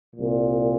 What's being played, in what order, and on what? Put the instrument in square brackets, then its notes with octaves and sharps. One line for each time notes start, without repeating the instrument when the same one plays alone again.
[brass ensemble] C2 A#2